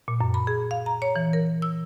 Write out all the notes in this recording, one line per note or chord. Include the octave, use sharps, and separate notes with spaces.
A#2
F#2
B5
G#4
F5
A#5
C#5
E3
A#4
E6